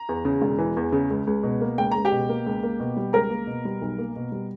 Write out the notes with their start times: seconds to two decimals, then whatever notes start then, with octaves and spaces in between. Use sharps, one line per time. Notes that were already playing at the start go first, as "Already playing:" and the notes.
Already playing: A#5
0.09 E2
0.25 C#3
0.42 E1
0.58 E3
0.77 E2
0.92 C#3
1.10 C#2
1.27 C#2
1.43 B2
1.61 A#3
1.78 C#2 G5
1.91 C#2 A#5
2.05 G4 G5
2.12 B2
2.29 A#3
2.46 C#2
2.63 A#3
2.80 B2
2.97 G3
3.13 C#2 A#4 A#5
3.30 A#3
3.47 B2
3.65 G3
3.81 B1
3.98 A#3
4.16 B2
4.32 G3